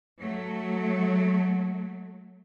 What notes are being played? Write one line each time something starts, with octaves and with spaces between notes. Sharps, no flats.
F#3 A3